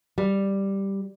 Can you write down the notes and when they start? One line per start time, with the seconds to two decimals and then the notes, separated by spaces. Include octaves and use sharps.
0.18 G3